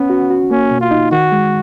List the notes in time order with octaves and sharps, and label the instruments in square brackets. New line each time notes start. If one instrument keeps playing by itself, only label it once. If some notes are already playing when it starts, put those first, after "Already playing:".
Already playing: [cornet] B3 [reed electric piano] C#4
[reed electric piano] F#4
F#4
[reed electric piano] A#3 [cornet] C#4
[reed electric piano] B2
[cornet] F4
[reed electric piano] D#4
[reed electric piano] D#3 [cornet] F#4
[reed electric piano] G#3